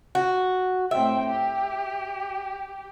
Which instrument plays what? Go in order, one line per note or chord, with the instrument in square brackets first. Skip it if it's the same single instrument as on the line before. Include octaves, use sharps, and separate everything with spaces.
[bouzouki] F#4
[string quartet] A2 C4 G5 [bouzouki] E5
[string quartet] G4